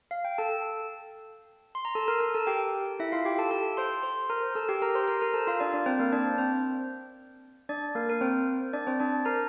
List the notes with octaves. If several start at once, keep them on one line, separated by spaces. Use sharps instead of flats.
F5
G5
A4 A5
C6
A#5
A4 A5
A#4 A#5
A#4 A#5
A4 A5
G4 G5
E4 E5
F4 F5
G4 G5
A4 A5
A4 A5
C5 C6
C5 C6
A#4 A#5
A4 A5
G4 G5
A#4 A#5
C5 C6
A#4 A#5
A#4 A#5
A4 A5
F4 F5
D4 D5
D4 D5
C4 C5
A#3 A#4
D4 D5
C4 C5
D4 D5
A#3 A#4
A#4
C4 C5
D4 D5
C4 C5
D4 D5
A#4 A#5